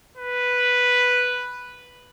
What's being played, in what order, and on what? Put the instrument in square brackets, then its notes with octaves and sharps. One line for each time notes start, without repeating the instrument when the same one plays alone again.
[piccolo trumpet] B4